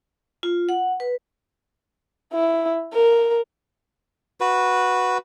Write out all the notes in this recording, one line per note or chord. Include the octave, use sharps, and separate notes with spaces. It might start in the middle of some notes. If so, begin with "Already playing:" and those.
F4
F#5
B4
E4
A#4
F#4 B4